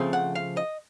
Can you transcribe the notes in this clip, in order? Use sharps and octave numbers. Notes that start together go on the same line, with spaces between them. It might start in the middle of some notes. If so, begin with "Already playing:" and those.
Already playing: C#3 F3 A3 C4
F#5
F5
D#5